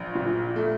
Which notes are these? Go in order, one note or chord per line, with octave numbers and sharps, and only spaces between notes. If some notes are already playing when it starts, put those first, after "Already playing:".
Already playing: A#1
A#2
A3